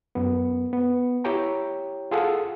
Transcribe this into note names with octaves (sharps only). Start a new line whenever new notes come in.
F#2 B3
B3
E4 G4 C#5 G5 A#5
F4 G#4 A4 F5 F#5